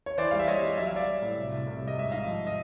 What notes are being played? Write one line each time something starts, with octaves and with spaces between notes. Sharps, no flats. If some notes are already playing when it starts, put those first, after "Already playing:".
C#5
E3 C5 D5
G3 F5
E5
G3 C#5 D#5
G3
F#3 E5
F5
F#3 D5 E5
F#3
A2
C2
C2
C2
G3
D#5
G#2 E5
G#2 D#5 F5
F3
D#5